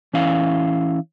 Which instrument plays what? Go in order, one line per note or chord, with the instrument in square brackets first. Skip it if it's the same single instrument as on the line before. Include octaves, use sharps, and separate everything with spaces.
[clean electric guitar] E3 C#4 E4 F5